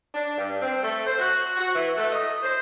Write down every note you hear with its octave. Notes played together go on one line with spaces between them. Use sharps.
D4
G2
C4
A3
C5
F#4
F#4
E3
A3
D#5
C5